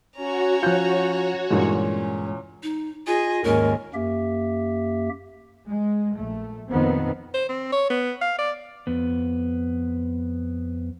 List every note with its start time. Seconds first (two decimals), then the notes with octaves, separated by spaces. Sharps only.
0.17 C#4 F#4 C#5 A#5
0.63 F3 F4 F#6 G6
1.51 E2 G2 A#2 G#3 C#4
2.63 D#4
3.07 F4 G#4 D#5
3.44 D#2 G#2 C#4 A#4
3.94 F#2 A#3 G4 E5
5.67 G#3
6.16 A#1 A3
6.69 F2 A#2 D#3 B3 C4
7.34 C5
7.49 C4
7.73 C#5
7.90 B3
8.21 F5
8.39 D5
8.87 F2 B3